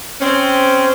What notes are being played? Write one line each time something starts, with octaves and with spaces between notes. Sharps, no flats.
C4 C#4